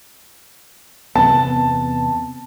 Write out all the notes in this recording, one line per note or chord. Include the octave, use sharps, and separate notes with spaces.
E2 C3 B3 A5